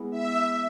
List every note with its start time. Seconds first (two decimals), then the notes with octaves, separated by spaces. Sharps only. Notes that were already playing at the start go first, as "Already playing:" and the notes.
Already playing: G#3 B3 E4
0.10 E5